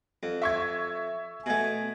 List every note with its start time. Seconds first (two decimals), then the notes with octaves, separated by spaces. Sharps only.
0.23 F2
0.42 E5 C#6 G#6
1.46 B2 A3 G#5